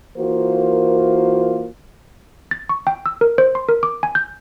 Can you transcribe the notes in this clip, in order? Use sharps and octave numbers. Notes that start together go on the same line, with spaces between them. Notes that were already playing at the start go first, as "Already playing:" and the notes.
E3 A#3 F4 F#4 A#4 C5
A6
C#6
G5
E6
A#4
C5
C6
A#4
D6
G#5
G6